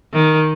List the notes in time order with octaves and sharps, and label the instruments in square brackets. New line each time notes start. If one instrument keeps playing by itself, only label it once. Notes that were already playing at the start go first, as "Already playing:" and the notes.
[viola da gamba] D#3